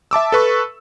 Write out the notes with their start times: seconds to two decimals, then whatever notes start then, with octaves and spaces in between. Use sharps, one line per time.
0.11 E5 A5 D6 E6
0.32 A4 B4 C#6